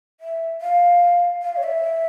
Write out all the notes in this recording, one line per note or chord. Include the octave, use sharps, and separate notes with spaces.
E5
F5
F5
C#5
E5